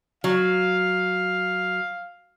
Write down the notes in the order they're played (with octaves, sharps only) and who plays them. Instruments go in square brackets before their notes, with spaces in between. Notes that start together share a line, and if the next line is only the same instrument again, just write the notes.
[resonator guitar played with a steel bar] F#3 [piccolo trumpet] F5